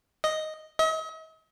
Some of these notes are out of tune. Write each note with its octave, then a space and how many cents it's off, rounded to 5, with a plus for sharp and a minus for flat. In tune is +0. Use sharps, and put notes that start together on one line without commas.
D#5 +0
D#5 +45